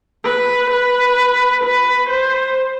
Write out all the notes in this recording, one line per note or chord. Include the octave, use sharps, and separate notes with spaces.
B4
B4
B4
C5